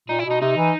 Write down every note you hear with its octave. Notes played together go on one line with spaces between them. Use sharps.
A#2 D#4
E4
B2
D#4
C3 D#4
E3